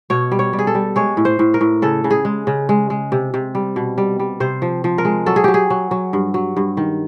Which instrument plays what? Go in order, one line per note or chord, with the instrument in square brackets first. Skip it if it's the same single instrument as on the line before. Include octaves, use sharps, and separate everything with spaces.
[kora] B2 C#5
G3
C#5
G3
G#4
A4
G3
G#3 C#5
A2
C5
A2
A#4
A2
C#3 A4
C#3
G#4
G#3
C#3
G#3
G#3
C3
C3
G3
B2
G3
G3
C3 C5
F3
F3
A#4
G#3
F#3 A4
G#4
F#3 G4
G#4
F#3
F#3
G2
F#3
G2
D#3